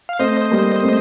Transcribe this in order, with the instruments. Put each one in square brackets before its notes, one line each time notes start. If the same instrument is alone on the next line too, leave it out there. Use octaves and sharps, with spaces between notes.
[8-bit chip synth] F5
[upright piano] A3 C4 [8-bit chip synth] C5 D#5
[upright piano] G3 A#3
A3 C4